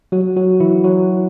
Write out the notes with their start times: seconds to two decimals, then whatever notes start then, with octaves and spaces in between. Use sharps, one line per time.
0.12 F#3 F#4
0.36 F#3 F#4
0.60 E3 E4
0.84 F#3 F#4